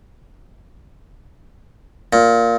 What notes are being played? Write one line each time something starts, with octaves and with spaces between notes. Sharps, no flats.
A#2